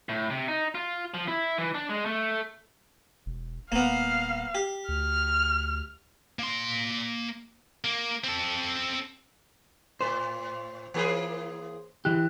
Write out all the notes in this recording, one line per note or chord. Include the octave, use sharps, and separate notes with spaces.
A2
C3
D#4
F4
F3
E4
E3
D4
G#3
A3
E1
D#1 A#3 B3 F5
G4
D2 F6
A#3 C6
A#3
C4 A4
A2 C5
E3 A#3 G#4
E3 G4 F#6